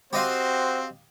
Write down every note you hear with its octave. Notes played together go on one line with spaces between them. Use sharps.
C4 F#4 G4 C5 D#5 F5